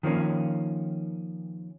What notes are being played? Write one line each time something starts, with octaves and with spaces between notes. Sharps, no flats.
D#3 F3 A#3 C#4